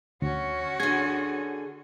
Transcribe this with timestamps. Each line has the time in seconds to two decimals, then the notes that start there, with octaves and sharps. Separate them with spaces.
0.22 D2 C#4 F#4
0.80 D3 G#4 G#6